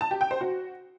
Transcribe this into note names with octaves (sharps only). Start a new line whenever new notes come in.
A5
G4
G5
C5
F#4